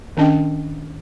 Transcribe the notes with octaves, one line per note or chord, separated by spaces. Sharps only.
D#3 C#4 D4 D#5 G5